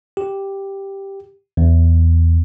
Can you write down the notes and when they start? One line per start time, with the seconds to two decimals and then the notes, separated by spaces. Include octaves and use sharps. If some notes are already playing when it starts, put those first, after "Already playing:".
0.17 G4
1.57 E2